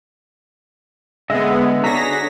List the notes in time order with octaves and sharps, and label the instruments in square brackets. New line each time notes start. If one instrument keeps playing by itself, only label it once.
[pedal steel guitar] D3 [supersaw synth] G#3 B3 [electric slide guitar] D#5 E5
[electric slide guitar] D4 A4 A#5 [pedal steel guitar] F#4 G#4 C#5 [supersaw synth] A#6 B6